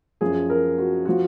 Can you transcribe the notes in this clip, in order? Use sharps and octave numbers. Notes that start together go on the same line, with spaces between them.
F#2 F3 G#4
A#4
F#4
F3 F#4